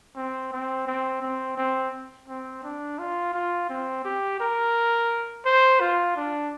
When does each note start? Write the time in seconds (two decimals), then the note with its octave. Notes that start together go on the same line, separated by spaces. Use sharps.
0.16 C4
0.52 C4
0.87 C4
1.22 C4
1.57 C4
2.28 C4
2.64 D4
2.99 F4
3.33 F4
3.69 C4
4.04 G4
4.40 A#4
5.45 C5
5.80 F4
6.16 D4